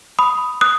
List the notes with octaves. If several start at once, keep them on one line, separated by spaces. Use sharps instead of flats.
B5 D#6
D#6 F#6